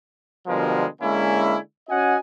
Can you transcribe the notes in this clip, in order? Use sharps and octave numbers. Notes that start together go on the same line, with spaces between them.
B2 D3 F3 G3 G#3 A#4
D3 G#3 A#3 C#4 E4
C#4 F#4 D#5 F#5 G#5